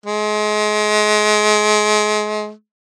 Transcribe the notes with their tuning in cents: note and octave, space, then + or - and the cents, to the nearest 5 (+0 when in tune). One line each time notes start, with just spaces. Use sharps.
G#3 +30